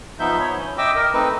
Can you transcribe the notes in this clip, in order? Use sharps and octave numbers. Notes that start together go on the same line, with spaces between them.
F3 B3 D#4 E5 G6
C#5 B5
C#4
D#5 E5 G5 D6 E6
A#4 D#5
A3 C4 D#4 B4